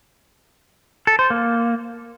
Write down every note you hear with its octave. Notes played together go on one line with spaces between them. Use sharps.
A4
C5
A#3